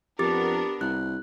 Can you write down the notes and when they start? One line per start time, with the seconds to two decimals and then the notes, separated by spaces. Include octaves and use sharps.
0.19 F2 B3 D4 G4 A#4 D6 A6
0.81 C2 F#6